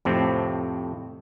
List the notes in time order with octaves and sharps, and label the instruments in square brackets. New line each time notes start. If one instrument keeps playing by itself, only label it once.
[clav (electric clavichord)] F2 A2 C3 C4